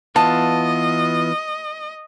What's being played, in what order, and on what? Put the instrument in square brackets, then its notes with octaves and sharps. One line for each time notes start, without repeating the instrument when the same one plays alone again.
[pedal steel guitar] E3 B3 F4 [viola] D#5 [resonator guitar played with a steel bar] A5